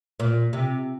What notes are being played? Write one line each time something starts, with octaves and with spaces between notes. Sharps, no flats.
A#2
C3